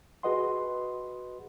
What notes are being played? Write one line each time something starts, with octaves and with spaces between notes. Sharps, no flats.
F#4 G#4 B4 D#5 F#5 C6